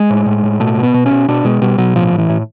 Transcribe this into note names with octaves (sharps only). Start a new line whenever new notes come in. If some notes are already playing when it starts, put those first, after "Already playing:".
Already playing: G#3
A2
A2
A2
B2 A3
B2
B3
B2
C#4
B2
B2 D4
B2 G#3
B2 G3
B2 F#3
A2 F3
A2
E3
A2